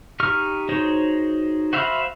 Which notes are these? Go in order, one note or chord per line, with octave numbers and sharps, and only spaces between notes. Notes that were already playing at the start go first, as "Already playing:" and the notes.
D#4 G4 C#6 F6
D#4 F#4 G#4 C5 C#5
F#4 C5 E5 F5 B5